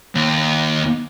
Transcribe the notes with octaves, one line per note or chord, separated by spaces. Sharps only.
D#2